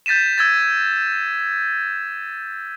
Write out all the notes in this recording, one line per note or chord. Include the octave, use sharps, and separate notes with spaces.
G6 A6 B6 D#7 E7
E6 G#6 A6